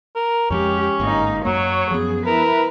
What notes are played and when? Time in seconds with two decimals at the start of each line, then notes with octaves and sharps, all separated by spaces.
0.15 A#4
0.50 F2 F3 G#3 C#4 G4
1.00 G1 G#2 A#3 D#4
1.45 F#2 F#3 A#3 C#5
1.91 F#2 F3 B3 G#4
2.26 E4 A#4 B4